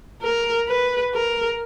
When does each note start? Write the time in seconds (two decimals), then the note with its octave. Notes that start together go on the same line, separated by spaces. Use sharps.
0.22 A#4
0.69 B4
1.14 A#4